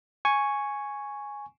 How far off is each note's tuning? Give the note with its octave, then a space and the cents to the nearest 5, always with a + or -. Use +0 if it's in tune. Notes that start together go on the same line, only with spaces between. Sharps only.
G#5 +0 C#6 +0